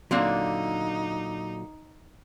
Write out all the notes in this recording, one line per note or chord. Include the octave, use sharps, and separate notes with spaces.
A#2 D3 F#3 A#3 C4 D#4